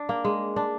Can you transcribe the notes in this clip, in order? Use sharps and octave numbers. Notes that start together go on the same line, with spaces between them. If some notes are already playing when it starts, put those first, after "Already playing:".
Already playing: D4
A#3
G#3
D4